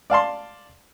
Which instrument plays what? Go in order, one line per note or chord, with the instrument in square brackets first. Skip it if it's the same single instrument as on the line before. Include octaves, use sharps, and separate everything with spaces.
[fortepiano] D5 F5 A5 C6